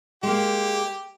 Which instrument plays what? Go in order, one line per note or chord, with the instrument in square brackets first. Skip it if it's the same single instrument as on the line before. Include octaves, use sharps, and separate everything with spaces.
[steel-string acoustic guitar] G#3 A#3 [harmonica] G4